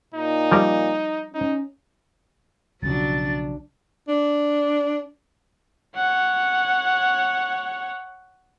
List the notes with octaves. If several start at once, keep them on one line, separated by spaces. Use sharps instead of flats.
A#2 D#4
F3 G3 A#4
C#4 D#4
B1 C#3 F3 F#3 D4 A6
D4
C#5 F#5